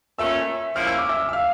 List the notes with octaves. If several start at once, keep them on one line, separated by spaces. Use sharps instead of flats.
A#2 A3 C#4 E5 E6
F3 A#3 C#4 E4 F6
E6
D6
E5 E6
E6
F5 F6